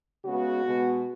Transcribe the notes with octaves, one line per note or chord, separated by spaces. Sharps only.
C#3 G#3 B3 F#4
B2 G#3 B3